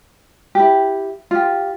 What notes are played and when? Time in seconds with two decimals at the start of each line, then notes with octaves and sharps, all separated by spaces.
0.55 E4 G4
1.31 F4 G4